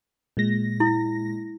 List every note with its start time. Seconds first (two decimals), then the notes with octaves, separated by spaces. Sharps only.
0.37 A#2 G#3 A#6
0.80 E4